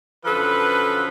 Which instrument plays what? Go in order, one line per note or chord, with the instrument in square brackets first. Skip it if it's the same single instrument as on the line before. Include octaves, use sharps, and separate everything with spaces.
[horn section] F#2 D3 F3 A4 B4